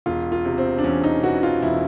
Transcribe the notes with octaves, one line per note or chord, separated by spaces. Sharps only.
E1 F4
F4
C3
C4
D4
E2 C#4
D#4
E3 F#4
F4
E1 E4